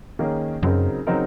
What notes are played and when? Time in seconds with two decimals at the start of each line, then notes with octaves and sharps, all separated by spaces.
0.19 D#3 A#3 C#4 G#4
0.63 F#2 C#3 F#3 C4 D#4 A#4
1.07 C#3 F#3 C4 D#4 A#4